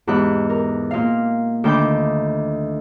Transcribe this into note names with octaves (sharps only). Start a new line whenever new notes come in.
E2 G#2 G4 B5 F#6
A#4
A#2 F5
D2 D#3 G5 B5 D6 G6